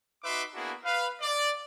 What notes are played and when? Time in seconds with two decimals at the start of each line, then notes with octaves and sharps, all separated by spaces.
0.24 D#4 F#4 B4 E5 C6 D6
0.55 A#3 B3 D4 E4 F#4 G#4
0.85 B4 F5
1.22 D5